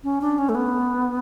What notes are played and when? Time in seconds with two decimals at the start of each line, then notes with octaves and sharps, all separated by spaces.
0.04 C#4
0.21 D4
0.38 C#4
0.49 A3
0.55 B3